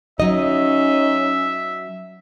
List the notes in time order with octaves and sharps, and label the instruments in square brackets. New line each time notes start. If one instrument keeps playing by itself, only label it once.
[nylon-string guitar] F#3 D#5 [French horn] C#4 [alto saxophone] D#4 [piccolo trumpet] E5